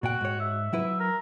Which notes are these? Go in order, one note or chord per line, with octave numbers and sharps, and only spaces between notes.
A#2 F#4 G5
G#2 C#5
E5
F#3 E4 B4
A#4